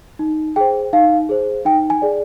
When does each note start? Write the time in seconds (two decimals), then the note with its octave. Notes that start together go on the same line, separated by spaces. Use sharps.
0.19 D#4
0.56 G#4 C5 G5
0.93 D#4 F5
1.29 G#4 C5
1.65 D#4 G5
1.90 G#5
2.02 G#4 D5